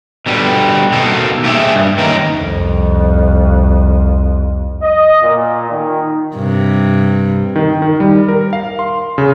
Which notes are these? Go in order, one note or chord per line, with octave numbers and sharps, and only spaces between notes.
B2 D3 G3
B2 D#3 A#3 A4
A3 A#3 G4 G#4 E5
G2
D#3 A#3 B3 C#4 A#4
C2 F2
D#5
A#2
D#3
G2 C3
D#3
D#3
G3
A#4
F5
C6
C#3